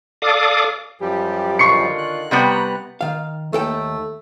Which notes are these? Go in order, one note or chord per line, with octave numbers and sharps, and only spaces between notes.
A4 D5 F5 D6 D#6
F#2 F3 G3 G4
D3 D#3 F4 C#6 C7 C#7
F#6
C3 G3 B3 G5 A#5
D#3 F5
D#2 A3 A4 G5